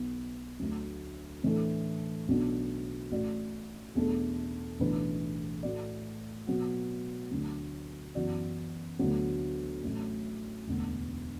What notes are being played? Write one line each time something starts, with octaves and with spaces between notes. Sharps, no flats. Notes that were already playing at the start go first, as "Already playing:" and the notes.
Already playing: B1 B2 B3
D2 D3 F#3
A2 E3 A3 D4 A4
B1 B2 F#3 B3 D4
A1 A2 A3 F#4 D5
E2 B2 A3 D4 A4
B1 A2 E3 D4 B4
A2 A3 F#4 D5
B2 F#3 B3 F#4
D2 D3 F#3
F#2 E3 B3 F#4 D5
D2 D3 F#3 B3
A1 A2 F#3
E1 D2 D3 B3